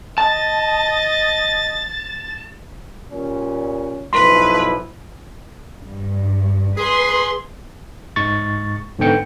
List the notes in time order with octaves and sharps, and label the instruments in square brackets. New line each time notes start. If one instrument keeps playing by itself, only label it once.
[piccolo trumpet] D#5 [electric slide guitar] A5 [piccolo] A6
[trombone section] A#2 G3 C#4
[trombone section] B1 F3 E4 [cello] B4 [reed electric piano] C6
[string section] G2
[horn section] G#4 [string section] B4 C6
[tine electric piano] G#2 G#3 C#6 A6
G#2 D3 B3 G5 C#7